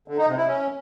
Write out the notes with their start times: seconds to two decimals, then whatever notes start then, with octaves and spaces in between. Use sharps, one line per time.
0.08 D3
0.18 D#4
0.27 C3
0.37 E4
0.47 C#4